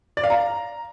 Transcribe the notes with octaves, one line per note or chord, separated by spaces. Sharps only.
D5
F5
A#5